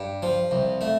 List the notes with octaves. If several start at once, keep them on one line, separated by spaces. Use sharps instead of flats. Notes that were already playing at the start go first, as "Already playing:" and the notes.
Already playing: G2
F3
C2
A3